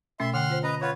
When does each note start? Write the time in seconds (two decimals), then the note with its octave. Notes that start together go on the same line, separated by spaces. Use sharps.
0.20 B2 A3 C#4 E5 C6
0.34 D3 F#5 G5 C6 F6
0.50 F4 C5
0.63 C#4 B4 D#5 A#5
0.81 F4 B4 C#5 F#5 C#6